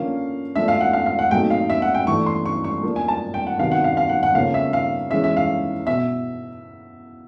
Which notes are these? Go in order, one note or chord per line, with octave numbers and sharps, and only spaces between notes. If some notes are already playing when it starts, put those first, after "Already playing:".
Already playing: D3 F3 A#3 C#4 F5
F3 A3 D4 E5
F5
F#5
F5
F5
F#5
A#2 F#3 A3 C4 D#4 G5
F5
E5
F#5
G5
E3 A3 D4 C#6
C6
C#6
C#6
F3 A#3 D4
G#5
A5
G5
F#5
C3 D#3 F#3 B3 D#4 F5
F#5
F5
F5
F#5
F#5
C#3 F3 A#3 C#4 F5
E5
F5
E3 G#3 C#4 E5
E5
F5
B2 E5